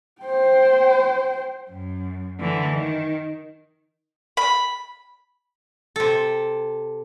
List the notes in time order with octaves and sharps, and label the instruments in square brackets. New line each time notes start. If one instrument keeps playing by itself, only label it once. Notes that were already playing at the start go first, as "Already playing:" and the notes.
[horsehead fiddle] C5 G5
[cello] F#2
D3 E3
D#3
[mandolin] B5
[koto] C3 A4